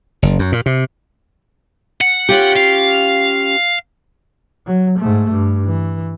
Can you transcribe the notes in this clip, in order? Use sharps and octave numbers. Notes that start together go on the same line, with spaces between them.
F#1
F#2
A#2
C3
F#5
C#4 F4 G4
F5
F#3
G#2 A3
G2
E3